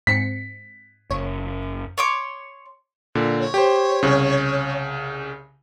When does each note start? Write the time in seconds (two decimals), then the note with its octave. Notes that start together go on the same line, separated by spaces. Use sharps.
0.07 G#2 C4 B6 C#7
1.11 F#1 C#5
1.98 C#5 C6 D6
3.15 A#2 D3
3.40 C#5
3.54 G4 C5
4.03 C2 C#3